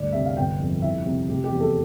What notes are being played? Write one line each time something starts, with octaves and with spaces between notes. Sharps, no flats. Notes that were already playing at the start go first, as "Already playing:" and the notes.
Already playing: D2 G2 D5
C3 E5
F5
G1 G5
F2
C2 E5
C3
F1 G4
G4
E2
A4